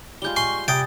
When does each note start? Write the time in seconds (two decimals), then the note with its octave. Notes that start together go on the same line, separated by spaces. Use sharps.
0.22 G3 G#3 F4 G6 G7
0.36 G#5 C6 C#6
0.68 C3 G3 G5 D#6 G#6 A6